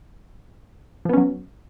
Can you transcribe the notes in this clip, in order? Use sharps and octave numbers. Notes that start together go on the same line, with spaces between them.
F3 F#3 B3 C#4